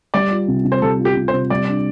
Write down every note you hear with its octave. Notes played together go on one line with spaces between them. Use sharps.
G3 D5
F4
C3
C3
C5
G3 A4
F4
G4
C3
C5
C3
G3 D5
D4